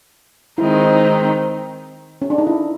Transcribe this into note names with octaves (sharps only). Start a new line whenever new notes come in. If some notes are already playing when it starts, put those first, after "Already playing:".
D#3 G#3 C4 D#4 E4
C#4
D4
D#4
E4